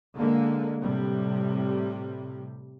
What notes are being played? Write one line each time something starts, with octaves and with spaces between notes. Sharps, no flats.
D3 G#3 A#3
A2 C3 G3